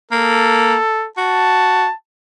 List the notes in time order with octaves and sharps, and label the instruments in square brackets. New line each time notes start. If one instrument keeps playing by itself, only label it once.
[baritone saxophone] A#3 [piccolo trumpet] A4
[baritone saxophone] F#4 [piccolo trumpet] A5